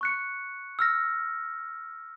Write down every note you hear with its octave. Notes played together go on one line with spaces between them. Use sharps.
C#6 F#6 C#7
E6 F6 A#6